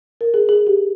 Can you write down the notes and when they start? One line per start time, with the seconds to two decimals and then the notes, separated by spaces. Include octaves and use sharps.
0.21 A#4
0.34 G#4
0.49 G#4
0.67 G4